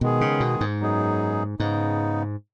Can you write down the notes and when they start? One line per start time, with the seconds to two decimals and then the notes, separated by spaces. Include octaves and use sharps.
0.01 B2 D#3 G#3 B3 G#4
0.21 C#3
0.40 B2
0.61 G#2
0.80 F#2 F#3 B3 D#4 G#4
1.59 G#2 C#3 B3 D#4